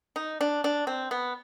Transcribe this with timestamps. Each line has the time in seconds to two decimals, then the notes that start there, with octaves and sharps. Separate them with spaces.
0.16 D#4
0.41 D4
0.64 D4
0.87 C4
1.11 B3